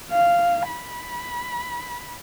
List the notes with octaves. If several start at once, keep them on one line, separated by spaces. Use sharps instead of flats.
F5
B5